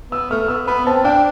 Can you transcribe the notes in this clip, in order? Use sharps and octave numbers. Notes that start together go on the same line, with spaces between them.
B3 E6
A3 F6
B3 E6
B3 B5
C4 A5
D4 G5